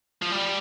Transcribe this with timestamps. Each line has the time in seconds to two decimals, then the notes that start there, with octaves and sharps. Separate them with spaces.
0.22 F3
0.32 G3